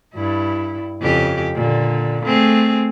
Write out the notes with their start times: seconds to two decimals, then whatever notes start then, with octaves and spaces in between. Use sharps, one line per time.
0.14 G2 E4
1.01 F2 C#3 G4
1.55 A#2 D3
2.25 A3 C4 G#4